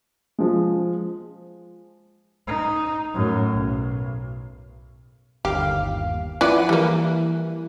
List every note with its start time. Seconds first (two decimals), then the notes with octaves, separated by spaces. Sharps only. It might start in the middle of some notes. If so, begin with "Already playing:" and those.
0.39 F3 G#3
2.47 D#4
3.14 F#2 A2
3.50 B1
5.45 G1 D#2 G4 F5
6.41 F3 E4 B4 D5 F#5 D#7
6.69 E3 G3 A#3